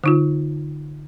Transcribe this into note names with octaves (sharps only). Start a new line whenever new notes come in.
D3 D#4 F4